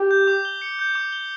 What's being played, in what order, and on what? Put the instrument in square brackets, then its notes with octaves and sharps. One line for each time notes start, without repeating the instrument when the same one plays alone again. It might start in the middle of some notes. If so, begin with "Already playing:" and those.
Already playing: [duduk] G4
[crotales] G6
D6
G7
C#7
G6
D6
G7